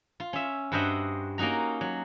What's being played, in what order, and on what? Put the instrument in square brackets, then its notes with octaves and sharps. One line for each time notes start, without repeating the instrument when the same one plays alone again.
[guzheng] F4
C#4 E5
G2 F#4 C5 D#5 E5 F#5
A#3 C#4 D#4 F#4 A#5
F#3